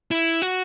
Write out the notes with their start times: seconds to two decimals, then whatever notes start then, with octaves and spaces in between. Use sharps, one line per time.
0.11 E4
0.42 F#4